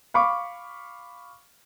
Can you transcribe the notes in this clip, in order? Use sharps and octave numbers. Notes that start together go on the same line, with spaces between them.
F5 B5 C#6 D6